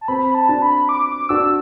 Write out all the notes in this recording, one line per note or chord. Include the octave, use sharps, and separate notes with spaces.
A5
C4 B5
A5
D4
B5
D6
D6
D4 F#4 E6